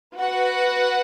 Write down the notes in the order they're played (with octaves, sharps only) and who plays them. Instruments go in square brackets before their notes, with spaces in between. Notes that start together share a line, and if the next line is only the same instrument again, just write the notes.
[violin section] F#4 B4 F#5